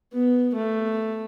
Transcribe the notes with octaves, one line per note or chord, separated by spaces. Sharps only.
B3
A3